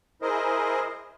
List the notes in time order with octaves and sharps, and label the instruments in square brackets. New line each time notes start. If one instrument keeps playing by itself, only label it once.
[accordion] E4 G#4 A#4 C5 D#5